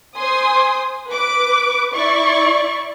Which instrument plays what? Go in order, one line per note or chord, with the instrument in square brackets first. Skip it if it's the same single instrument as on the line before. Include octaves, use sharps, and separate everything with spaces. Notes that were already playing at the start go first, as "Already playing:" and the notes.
[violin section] C5 G#5 C6 D#6
B4 D6
E4 D5 C#6